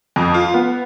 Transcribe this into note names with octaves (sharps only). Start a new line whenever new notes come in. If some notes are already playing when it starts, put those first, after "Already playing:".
F2
F4
B3